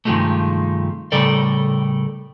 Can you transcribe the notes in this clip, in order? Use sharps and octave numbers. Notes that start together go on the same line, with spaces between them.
G2 C3 D#3 F3 G#3 A3
A2 C#3 G3 A4 A#4 D5